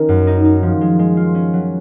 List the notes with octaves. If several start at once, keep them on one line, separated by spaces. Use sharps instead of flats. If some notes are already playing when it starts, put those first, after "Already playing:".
Already playing: D#3 C#4 A#4
F#2
D#4
D#4
F3
G#3
G#3
F4
C#4
F#3